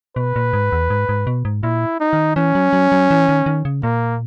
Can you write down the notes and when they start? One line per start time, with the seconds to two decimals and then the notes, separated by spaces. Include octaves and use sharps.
0.16 B2 B4
0.36 A#2
0.53 G#2
0.72 E2
0.90 G#2
1.09 G#2
1.27 B2
1.45 G#2
1.63 A#2 E4
2.00 D#4
2.13 D#3
2.36 E3 C#4
2.55 F#3
2.73 F#3
2.92 F#3
3.11 E3
3.29 D#3
3.46 D#3
3.65 C#3
3.83 A#2 A#3